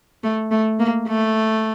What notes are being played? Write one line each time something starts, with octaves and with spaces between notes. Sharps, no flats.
A3
A3
A#3
A3